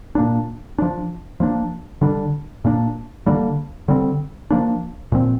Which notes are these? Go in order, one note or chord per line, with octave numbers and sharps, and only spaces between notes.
A#2 A#3 D4
F3 D4
F3 A#3 D4
D3 G3 D4
A#2 A#3 D4
D3 G3 A#3 D4
D3 G3 C4
F3 A#3 D4
A#2 F3 C4